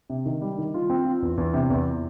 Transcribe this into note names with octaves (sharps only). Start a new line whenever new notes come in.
C3
D#3
G3
D#3
F4
C4
F4
E2
E2
C3
E2